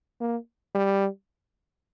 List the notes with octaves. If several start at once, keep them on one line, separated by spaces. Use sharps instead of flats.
A#3
G3